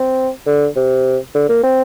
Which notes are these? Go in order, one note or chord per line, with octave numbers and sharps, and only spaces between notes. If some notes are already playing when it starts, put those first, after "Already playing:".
Already playing: C4
D3
C3
D3
A#3
C4